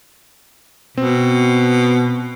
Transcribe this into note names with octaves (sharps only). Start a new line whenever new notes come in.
B2 C4